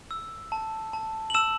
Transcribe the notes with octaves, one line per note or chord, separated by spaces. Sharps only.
E6
A5
A5
F#7
A5 E6 E7